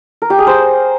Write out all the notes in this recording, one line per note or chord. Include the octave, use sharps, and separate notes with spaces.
A#4
G4
G#4
C5